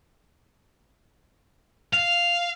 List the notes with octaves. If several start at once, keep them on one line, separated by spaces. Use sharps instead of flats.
F5